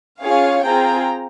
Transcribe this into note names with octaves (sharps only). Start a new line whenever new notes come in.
C#4 F4 G#4 C#5 F5
C4 F4 G#4 G5 A#5